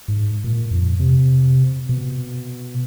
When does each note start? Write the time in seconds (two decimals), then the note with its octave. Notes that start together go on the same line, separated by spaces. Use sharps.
0.08 G#2
0.44 A#2
0.71 F2
1.00 C3
1.89 B2